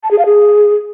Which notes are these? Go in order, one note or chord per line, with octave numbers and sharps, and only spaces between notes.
A5
G#4
F5
G#4